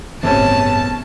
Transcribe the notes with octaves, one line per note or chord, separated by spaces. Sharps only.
G1 E2 A2 C3 E3 A3 C#4 A5